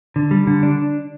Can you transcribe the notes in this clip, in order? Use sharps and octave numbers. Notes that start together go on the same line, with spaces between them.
D3
G3
D3
D4